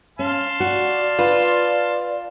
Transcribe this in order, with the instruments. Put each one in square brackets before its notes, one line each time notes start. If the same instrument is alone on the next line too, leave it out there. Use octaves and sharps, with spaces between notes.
[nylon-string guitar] C#4 [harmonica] F5 A5 C6
[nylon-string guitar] F#4 [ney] D5
[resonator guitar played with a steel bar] F4 [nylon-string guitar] B4